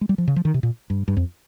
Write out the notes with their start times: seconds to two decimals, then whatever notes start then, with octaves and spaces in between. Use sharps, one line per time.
0.01 G#3
0.09 G3
0.18 F3
0.28 C#3
0.36 F3
0.45 D#3
0.54 C3
0.63 A#2
0.90 G2
1.08 G2
1.17 F2